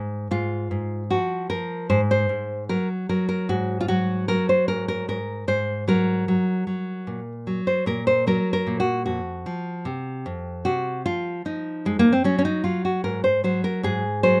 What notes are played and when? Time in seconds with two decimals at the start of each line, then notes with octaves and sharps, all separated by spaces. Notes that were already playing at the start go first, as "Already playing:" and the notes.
Already playing: G#2
0.31 G#2 F4
0.71 G#2
1.10 F3 F#4
1.50 F3 A#4
1.90 G#2 C5
2.11 C5
2.29 G#2
2.69 F#3 A#4
3.09 F#3 A#4
3.29 A#4
3.49 G#2 F#4
3.81 F4
3.88 F#3 F#4
4.28 F#3 A#4
4.49 C5
4.68 G#2 A#4
4.88 A#4
5.08 G#2 A#4
5.48 G#2 C5
5.88 F#3 A#4
6.28 F#3
6.67 F#3
7.07 A#2
7.47 F#3
7.67 C5
7.86 A#2 A#4
8.07 C5
8.27 F#3 A#4
8.53 A#4
8.67 A#2
8.80 F#4
9.06 F2 F#4
9.46 F3
9.85 C3
10.26 F2
10.65 C3 F#4
11.06 F3 F4
11.45 F3 D#4
11.85 F2 G#3
11.99 A#3
12.12 C4
12.24 F#3 C#4
12.39 C#4
12.45 D#4
12.64 F#3 F4
12.85 F#4
13.04 G#2 A#4
13.24 C5
13.44 F#3 C5
13.64 A#4
13.83 G#2 G#4
14.23 F#3 C5